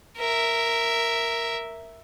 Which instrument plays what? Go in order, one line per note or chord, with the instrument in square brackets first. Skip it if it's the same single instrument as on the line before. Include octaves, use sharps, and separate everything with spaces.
[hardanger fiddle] A#4 E5